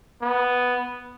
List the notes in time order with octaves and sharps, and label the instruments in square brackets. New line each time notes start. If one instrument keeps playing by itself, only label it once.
[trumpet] B3